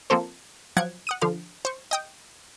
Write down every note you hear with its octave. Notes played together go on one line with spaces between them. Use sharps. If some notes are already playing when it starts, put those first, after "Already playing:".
F3 A#3 C4 A4 C5
F3 F#3 F#5 G#6 C#7 D7
F#5 D#6 D#7
D3 F3 F5 F6
C5 C#6
D#5 G5 D#6